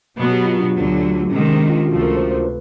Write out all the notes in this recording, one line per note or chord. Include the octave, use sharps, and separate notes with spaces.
B2 F#3 B3
G4
F4
D4
D2 D3 F#3
C3 D#3 G#3 C#4
D4
F4
C#2 C3 F3 A3 F#4
A#4
C5
C5
B4